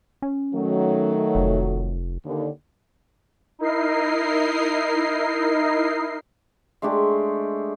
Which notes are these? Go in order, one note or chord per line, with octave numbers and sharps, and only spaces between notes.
C#4
D#3 F#3 A3
F1
D#2 D3
D#4 E4 A#4 D#5 C7
G#3 A3 D4 G4